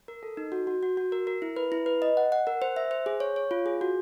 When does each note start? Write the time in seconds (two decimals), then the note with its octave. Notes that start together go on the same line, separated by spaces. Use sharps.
0.08 A#4
0.23 A4
0.37 D#4
0.52 F#4
0.67 F#4
0.83 F#4
0.97 F#4
1.12 A#4
1.27 A#4
1.42 E4
1.56 B4
1.72 E4
1.86 B4
2.02 D#5
2.17 F#5
2.32 F#5
2.47 A#4
2.62 C5
2.76 E5
2.91 C5
3.06 G#4
3.20 C#5
3.36 C#5
3.51 F4
3.66 G#4
3.81 F#4